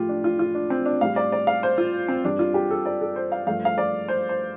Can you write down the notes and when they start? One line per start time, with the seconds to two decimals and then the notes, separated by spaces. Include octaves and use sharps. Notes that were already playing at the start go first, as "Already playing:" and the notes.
Already playing: A2 F3 A3 F4 G4
0.09 D4
0.24 F4
0.39 F4
0.55 D4
0.70 C4
0.86 D4
1.01 A2 G3 F5
1.16 D5
1.32 D5
1.47 F5
1.63 C5
1.78 F4
2.08 C4
2.24 G2 G3 D4
2.39 F4
2.54 G4
2.70 A4
2.85 D5
3.01 A4
3.16 C5
3.32 F5
3.47 G2 F3 A3 F5
3.65 F5
3.78 D5
4.08 C5
4.29 C5